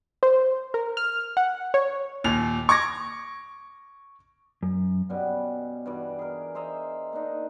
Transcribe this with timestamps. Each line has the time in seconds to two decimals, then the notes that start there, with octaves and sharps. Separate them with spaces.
0.23 C5
0.74 A#4
0.97 F6
1.37 F#5
1.74 C#5
2.24 D#2 A#2 F7
2.69 C#6 D6 G#6 A#6
4.63 F#2
5.09 B2 G3 C#4 F#4
5.86 G2 B2 E3 D5
6.19 G#4 A#4
6.55 C5 D#5 E5 A#5
7.13 A#3 D4 D#4 D#5